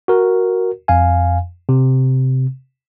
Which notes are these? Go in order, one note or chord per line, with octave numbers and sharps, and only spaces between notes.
F#4 A#4
F2 F5 G#5
C3